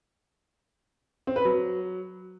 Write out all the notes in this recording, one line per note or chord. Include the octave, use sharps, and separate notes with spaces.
C4
B4
F#3